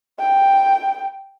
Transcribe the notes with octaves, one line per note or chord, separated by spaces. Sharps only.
G5